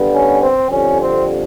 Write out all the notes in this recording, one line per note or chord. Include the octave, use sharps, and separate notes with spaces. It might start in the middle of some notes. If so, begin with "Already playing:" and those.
Already playing: G2 D3 G3 B3
C#4
C4
F2 D3 G3 C#4
C4